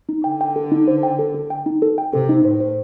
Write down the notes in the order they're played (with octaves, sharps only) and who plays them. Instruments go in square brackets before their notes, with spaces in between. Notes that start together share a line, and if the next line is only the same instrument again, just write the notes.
[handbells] D#4
[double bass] D3 [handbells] G5
[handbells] G5
A4
D#4
C5
G5
A4
A4
G5
D#4
A4
G5
[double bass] C3 [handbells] A4
[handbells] D#4
[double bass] A2 [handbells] C5
[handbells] C5